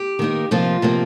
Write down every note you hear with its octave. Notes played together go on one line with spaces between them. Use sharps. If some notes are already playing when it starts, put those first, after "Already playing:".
Already playing: G4
D#3 A#3 D#4
C3 F3 A#3 D#4 F4
C3 F3 A#3 D#4